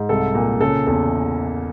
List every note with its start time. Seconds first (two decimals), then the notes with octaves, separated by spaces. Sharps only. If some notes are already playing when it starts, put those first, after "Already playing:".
Already playing: G#2
0.09 C2 A4
0.35 A#2
0.60 C#3 A4
0.87 E2 A4